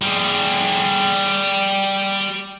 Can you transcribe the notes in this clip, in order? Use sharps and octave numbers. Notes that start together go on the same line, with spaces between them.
G3 G#4